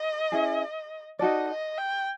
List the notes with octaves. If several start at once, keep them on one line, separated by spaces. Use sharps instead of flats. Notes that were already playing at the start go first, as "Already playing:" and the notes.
Already playing: D#5
C#4 E4 G#4
D#4 F#4 A4 D5 D#5
D#5
G5